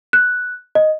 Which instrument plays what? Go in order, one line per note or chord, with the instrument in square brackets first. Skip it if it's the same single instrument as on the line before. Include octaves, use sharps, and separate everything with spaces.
[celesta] F#6
D#5